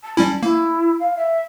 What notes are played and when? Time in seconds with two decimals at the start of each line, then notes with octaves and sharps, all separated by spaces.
0.03 A5
0.17 G3 C#4 E4
0.43 A#3 E4
0.99 F5
1.16 E5